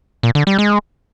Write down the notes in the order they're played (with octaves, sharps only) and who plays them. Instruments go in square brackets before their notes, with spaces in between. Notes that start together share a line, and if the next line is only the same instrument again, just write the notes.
[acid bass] A#2
D3
G3
G#3